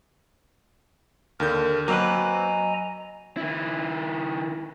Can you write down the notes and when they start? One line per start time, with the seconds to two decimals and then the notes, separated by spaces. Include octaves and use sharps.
1.40 D#2 D3 A#4 G6
1.88 F#3 A#3 C4 B4 D#5 G#5 A#5
3.37 D#3 E4